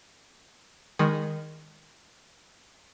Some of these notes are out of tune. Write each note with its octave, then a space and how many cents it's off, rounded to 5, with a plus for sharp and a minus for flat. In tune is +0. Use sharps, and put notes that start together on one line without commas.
D#3 +0 G#3 -25